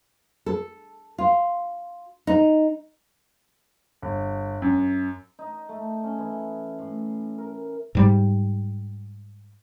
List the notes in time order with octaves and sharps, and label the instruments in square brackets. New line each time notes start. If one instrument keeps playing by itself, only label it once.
[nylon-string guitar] A4
F4
D#4
[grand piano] G1
F#2
[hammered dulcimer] D#4
A3
C#4
E3
A2
A#4
[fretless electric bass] G#2 G3